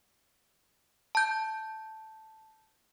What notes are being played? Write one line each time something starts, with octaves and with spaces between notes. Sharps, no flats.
A5 G6